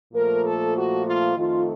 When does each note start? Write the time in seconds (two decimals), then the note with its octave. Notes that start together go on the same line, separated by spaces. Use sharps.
0.13 A#2 F3 A3 A#4
0.44 A4
0.75 F#4
1.06 F4
1.36 F2 D#3 A3 F4